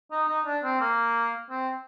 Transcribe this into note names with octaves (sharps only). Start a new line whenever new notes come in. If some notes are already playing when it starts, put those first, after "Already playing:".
D#4
D#4
D4
C4
A#3
C4